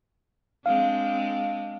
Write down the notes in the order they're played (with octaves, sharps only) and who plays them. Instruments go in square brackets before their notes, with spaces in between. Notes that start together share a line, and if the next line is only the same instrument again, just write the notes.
[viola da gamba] G#3 C4 D4 [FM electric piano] F5